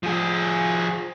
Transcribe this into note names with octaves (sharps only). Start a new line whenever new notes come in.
F3 G#4